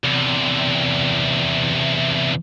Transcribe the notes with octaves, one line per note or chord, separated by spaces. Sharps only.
E2 C3